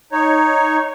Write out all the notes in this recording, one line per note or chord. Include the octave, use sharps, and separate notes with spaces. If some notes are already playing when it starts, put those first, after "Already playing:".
D#4 C#5